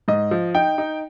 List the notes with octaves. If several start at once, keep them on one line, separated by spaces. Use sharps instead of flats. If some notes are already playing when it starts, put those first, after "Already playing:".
G#2 D#5
F3
D#4 G5
D#4